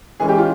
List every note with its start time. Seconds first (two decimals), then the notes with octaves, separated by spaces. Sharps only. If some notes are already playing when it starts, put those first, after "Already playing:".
0.20 E3 G#3 C#4 G#4
0.29 G4
0.38 F4